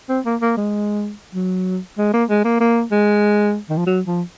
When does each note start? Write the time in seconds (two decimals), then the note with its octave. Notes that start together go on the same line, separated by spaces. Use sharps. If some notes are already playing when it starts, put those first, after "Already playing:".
0.09 C4
0.25 A#3
0.41 A#3
0.57 G#3
1.35 F#3
1.98 G#3
2.13 A#3
2.30 G#3
2.45 A#3
2.60 A#3
2.91 G#3
3.70 D#3
3.78 F3
3.86 F#3
4.07 F3